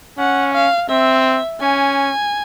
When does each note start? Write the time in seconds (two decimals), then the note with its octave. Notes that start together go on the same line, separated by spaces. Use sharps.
0.18 C#4 F#5
0.54 F5
0.89 C4 E5
1.61 C#4 G#5